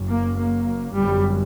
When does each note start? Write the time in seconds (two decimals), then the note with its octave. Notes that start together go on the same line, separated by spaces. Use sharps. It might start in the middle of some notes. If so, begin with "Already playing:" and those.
Already playing: F#1 F#2
0.10 A#3
0.39 A#3
0.95 G1 F#2 G3